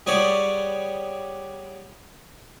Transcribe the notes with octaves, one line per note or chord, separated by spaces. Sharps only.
G3 B3 G#4 C#5 D5